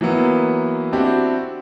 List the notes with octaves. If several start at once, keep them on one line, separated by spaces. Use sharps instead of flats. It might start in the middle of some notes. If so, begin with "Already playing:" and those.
E3 F#3 A#3 B3
C4 D4 E4 F#4 G4